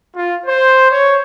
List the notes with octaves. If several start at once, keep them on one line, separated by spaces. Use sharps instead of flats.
F4
C5
C#5